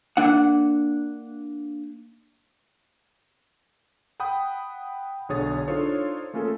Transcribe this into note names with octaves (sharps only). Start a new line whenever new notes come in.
A#3 D4 F#5
F#5 G5 B5 D#6
B1 D3 G#4 C#5 D#6 A6
D4 D#4 F4 A4 C5 C#5
A3 A#3 C#4 F4 G#4 A4